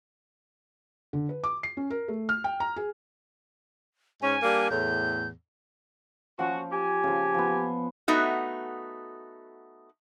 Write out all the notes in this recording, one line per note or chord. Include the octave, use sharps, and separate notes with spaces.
D3
B4
D6
C7
C#4
A#4
A3
F6
G5
A#5
G#4
G#2 C#4 G#5
G3 A#3 D4
E2 A2 G6
F3 C#4 F#4
G4 G#5
C#3 F3
F3 B3
A3 B3 D#4 F#4